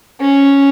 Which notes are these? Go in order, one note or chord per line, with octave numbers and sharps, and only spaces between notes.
C#4